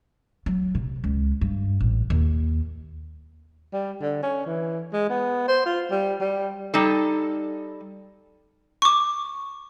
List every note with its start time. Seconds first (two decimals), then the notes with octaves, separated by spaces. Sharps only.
0.46 F#3
0.75 C3
1.04 C#2
1.41 G2
1.80 A1
2.10 D#2
3.73 G3
4.01 D3
4.23 C#4
4.46 E3
4.93 G#3
5.10 B3
5.48 C5
5.66 F4
5.91 G3
6.20 G3
6.74 G3 D#4 A4
8.82 C#6 D6